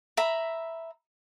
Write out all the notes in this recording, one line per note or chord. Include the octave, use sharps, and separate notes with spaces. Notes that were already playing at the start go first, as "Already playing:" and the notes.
E5 A#5 B5